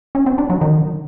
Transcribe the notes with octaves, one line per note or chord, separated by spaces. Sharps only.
C#4
C4
D4
F#3
D#3